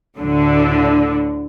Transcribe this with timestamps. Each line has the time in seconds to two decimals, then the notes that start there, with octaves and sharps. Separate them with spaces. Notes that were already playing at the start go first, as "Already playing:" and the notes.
0.18 D2 A2 D3